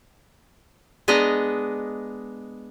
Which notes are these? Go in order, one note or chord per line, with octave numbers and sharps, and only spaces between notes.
G#3 B3 D4 D#5 A#5